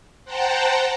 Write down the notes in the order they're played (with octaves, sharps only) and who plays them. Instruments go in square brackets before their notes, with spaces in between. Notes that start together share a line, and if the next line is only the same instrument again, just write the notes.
[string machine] C5 F#5 G5 A5 A#5